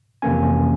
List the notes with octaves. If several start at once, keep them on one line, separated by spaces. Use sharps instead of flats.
F2 C3 E3 A#3 C#4 G#5